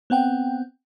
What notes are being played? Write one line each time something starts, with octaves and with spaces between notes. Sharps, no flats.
B3 C4 F#5 G5